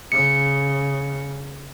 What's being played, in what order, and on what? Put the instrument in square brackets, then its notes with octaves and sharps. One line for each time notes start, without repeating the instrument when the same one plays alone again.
[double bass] C#3 [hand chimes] C#7